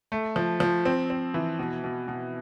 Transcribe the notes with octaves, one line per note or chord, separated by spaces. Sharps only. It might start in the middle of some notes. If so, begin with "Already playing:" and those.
A3
F3
F3
C4
C4
E3
B2
B2
B2